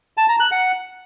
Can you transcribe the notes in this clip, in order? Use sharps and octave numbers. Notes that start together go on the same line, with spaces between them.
A5
A#5
F#6
F#5